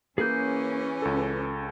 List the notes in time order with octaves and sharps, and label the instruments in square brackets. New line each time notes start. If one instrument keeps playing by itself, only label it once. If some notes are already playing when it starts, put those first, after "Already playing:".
[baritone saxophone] E3 [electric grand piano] A#3 [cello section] C#4 [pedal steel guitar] G#4 G6
[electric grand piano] C#2 A4